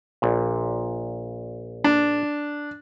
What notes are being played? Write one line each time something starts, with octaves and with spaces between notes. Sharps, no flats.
A#1 A#2
D4